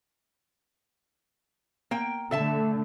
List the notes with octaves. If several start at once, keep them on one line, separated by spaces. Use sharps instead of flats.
A#3 G5
D3 A3 A4 E5 A5